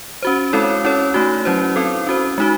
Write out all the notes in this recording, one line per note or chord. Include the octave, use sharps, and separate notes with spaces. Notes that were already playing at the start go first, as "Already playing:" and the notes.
C#4 F#4 C5
G#3 C4 E4 A4 C#5
C#4 E4 A4 C#5
A3 D#4 F#4
F#3 C#4 E4 C5
C4 E4 A4
C#4 F#4 C5
G#3 D#4 F#4